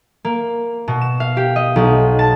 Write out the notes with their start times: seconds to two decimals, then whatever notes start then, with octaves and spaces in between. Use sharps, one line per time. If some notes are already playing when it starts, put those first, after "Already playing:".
0.25 A#3
0.88 B2
1.01 E7
1.20 F5
1.37 G4
1.56 D#5
1.76 B1
2.19 A5